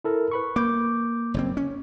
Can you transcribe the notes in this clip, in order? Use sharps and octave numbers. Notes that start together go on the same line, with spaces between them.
E4 A4 A#4
B4 B5 C#6
A#3 D6 G6
F#1 G2 C4
C#4